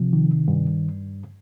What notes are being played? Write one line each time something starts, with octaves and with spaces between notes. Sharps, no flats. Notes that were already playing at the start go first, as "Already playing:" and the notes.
Already playing: C3 F3
D#3
G2